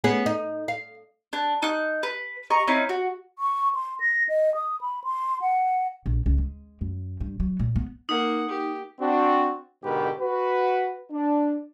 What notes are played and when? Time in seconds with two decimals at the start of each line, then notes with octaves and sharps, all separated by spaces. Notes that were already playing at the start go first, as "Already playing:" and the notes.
0.04 B3 C#4 G#4
0.26 D#4
0.68 F5
1.33 D4 F#6
1.62 D#4 F#6
2.03 B4
2.50 D#5 A#5 C#6
2.67 C4 C#4 D#4 E4
2.89 F#4
3.39 C#6
3.75 C6
4.00 A#6
4.29 D#5
4.55 D#6
4.81 B5
5.04 C6
5.42 F#5
6.06 A#1
6.26 C#2
6.38 G#3
6.81 F#2
7.20 G2
7.40 F#3
7.59 A#2
7.76 B3
8.09 A#3 D#4 F#5
8.49 G4
9.00 C4 D4 F#4
9.83 G#2 B2 D3 G4 A#4 B4
10.20 F#4 B4
11.12 D4